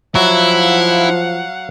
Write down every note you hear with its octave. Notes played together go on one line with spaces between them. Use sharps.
F3 F#3 E4 F5 F#5